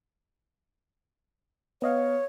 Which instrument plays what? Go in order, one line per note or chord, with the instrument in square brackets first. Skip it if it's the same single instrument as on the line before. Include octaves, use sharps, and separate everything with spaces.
[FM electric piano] B3 D#5 F5 [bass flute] C#5